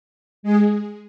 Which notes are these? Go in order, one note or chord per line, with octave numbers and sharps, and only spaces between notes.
G#3 G#4